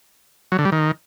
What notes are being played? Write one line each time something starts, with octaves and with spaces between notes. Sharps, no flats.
F#3
D3
G3
D#3